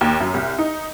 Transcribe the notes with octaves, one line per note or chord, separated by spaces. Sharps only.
D#2
F#2
C2
D#4